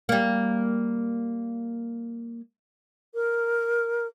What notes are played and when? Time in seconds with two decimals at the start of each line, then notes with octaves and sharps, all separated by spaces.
0.09 G3 A#3
3.14 A#4